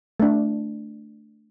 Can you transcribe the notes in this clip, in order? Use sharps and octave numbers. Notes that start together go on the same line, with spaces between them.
A3 D4